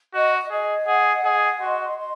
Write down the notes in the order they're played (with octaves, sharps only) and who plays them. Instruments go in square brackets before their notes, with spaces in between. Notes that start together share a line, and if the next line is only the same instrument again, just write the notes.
[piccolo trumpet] F#4 [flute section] D#5
[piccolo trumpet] G#4 [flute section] D#5
[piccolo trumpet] G#4 [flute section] F#5
[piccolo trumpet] G#4 [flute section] D#5
[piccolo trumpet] F#4 [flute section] C6
[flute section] C6